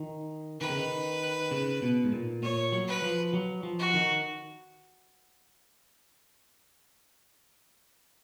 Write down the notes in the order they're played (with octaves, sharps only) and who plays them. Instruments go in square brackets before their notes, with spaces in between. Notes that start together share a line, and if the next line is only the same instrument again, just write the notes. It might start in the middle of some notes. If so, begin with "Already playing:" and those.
Already playing: [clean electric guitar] D#3
[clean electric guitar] D#3 [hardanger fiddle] B4
[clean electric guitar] C#3
D#3
C#3
B2
G#2
A#2
[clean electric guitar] A#2 [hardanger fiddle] C#5
[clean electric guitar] F#3
[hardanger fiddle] B4
[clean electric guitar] F3
F#3
F3
[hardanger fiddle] F#4
[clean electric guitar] D#3